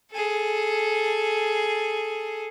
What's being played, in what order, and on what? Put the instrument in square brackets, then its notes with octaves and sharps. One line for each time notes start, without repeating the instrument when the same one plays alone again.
[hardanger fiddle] G#4 A4